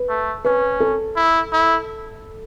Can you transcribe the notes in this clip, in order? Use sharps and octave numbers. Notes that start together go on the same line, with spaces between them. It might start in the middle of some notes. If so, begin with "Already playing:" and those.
Already playing: B4
A3
C#4 B4
A4
E4
E4